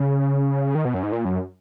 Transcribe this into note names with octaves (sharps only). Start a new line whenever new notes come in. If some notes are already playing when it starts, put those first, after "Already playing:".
Already playing: C#3
D#3
B2
F#2
G#2
A#2
F#2